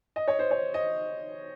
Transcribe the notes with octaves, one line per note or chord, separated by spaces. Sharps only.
D#5
C#5
C5
C#5
D#5